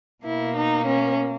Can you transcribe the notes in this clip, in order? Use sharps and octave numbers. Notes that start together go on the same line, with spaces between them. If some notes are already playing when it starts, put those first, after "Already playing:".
B2 A#3 E4
D#4
C#4